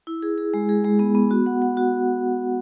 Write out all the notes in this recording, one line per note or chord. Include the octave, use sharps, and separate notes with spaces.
E4
G#4
G#4
G#3
G#4
G#3
B3
B3
F#4
F#5
F#5
F#4